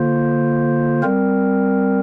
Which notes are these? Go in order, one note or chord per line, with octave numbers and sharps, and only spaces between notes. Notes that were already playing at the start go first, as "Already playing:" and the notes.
Already playing: D3 A#3 F4 C5
G3 C4 A#4